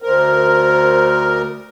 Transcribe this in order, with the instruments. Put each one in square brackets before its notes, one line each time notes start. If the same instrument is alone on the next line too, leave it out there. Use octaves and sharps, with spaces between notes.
[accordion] D2 A#4 [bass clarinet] C5